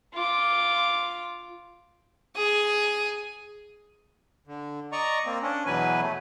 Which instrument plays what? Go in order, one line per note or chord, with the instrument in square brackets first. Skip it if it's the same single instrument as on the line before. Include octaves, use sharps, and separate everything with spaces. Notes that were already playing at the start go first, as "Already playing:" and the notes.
[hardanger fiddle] F4 D6
[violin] G#4 G#5
[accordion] D3
D5 D#5 A#5 C#6
A#3 C4
C#4 D4
E2 B2 E3 F#3 B4 G#5
A3